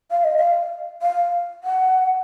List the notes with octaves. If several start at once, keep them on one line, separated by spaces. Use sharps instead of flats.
F5
D#5
F5
F5
F#5